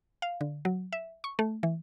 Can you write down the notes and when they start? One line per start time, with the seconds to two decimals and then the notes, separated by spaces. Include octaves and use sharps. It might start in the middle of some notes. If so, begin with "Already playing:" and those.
0.22 F5
0.41 D3
0.65 F#3
0.92 E5
1.24 C#6
1.39 A3
1.63 E3